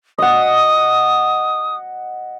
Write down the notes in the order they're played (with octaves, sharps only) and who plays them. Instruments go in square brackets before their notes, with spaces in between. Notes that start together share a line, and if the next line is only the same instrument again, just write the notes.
[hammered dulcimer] D#5 F#5 [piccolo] D#6